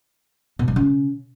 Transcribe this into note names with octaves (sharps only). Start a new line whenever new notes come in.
B2
F#3
C#3